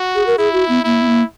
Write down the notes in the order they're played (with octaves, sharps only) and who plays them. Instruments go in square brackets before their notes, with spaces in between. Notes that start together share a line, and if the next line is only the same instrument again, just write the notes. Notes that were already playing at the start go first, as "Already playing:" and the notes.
Already playing: [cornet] F#4
[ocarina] G#4
A#4
[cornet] E4 [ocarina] G#4
[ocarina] F#4
B3
[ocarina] A#3 [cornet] E4
[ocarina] B3
A#3